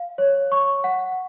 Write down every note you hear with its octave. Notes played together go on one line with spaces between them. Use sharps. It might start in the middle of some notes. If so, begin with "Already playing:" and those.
Already playing: F5
C#5
C#6
F#5